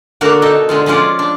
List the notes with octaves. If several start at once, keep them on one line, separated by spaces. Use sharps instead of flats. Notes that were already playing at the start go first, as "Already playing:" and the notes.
D3 A#3 D4 F#4 A#4
B2 D#4 A4 D#5
D3 G#3 F4
F3 G#3 C#4 F4 D5
D4